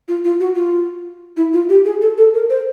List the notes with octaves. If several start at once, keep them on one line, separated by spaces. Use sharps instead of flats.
F4
F4
F#4
F4
E4
F4
G4
G#4
A4
A4
A#4
C5